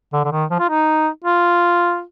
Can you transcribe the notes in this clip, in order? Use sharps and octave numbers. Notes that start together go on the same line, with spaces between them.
D3
D3
D#3
F3
F4
D#4
F4